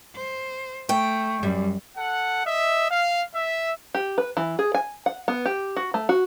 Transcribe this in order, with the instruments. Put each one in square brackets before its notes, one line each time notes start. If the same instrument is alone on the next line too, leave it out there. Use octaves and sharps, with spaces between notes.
[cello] C5
[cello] A3 [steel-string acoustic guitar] G5 [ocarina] C#6
[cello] F#2 [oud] G3
[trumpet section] A4 F#5
D#5 E5
F5
E5
[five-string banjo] G4
B4
E3
G#4
G#5
F#5
B3
G4
F#4
A3
F#4